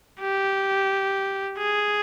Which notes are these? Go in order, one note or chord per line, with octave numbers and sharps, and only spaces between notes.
G4
G#4